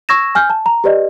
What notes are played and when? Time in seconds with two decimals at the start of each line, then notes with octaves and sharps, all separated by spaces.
0.09 C#6 E6 G#6 A#6 E7
0.35 G#5 F6 G6
0.50 A5
0.66 A#5
0.84 G4 B4 D5 D#5